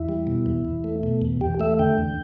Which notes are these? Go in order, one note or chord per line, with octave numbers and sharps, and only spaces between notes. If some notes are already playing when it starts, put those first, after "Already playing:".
Already playing: E2 E4
G3
B2
E2
E2
A3
B2
E2
E2 G4
A3 E5
D3 G5
E2